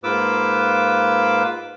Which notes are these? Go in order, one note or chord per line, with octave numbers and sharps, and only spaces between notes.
G#2 A#3 F4 B4 D6 E6